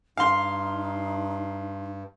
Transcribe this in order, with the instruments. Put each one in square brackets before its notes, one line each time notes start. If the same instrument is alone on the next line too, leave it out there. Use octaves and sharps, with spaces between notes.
[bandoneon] G2 [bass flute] D#4 [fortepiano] F5 C6